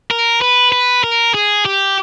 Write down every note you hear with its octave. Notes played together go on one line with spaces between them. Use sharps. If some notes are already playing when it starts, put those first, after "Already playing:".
A#4
B4
B4
A#4
G#4
G4